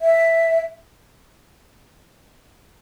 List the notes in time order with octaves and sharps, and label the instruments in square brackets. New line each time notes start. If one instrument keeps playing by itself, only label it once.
[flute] E5